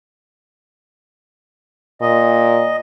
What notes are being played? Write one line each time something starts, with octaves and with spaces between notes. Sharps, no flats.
A#2 D#5